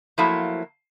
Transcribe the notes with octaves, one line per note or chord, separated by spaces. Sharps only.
F3 F#3 A3 A#3 E4